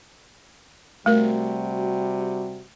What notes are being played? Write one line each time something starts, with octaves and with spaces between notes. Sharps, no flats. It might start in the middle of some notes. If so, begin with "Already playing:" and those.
C3 G3 A3 F#4 A#4